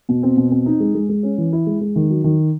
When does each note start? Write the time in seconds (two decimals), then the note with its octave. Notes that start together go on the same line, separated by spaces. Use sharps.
0.09 B2
0.23 C4
0.37 B2
0.51 C4
0.66 D#4
0.80 G#3
0.95 G#3
1.09 G#3
1.23 C#4
1.38 E3
1.53 E4
1.67 G#3
1.81 G#3
1.96 D#3
2.10 F#3
2.24 D#3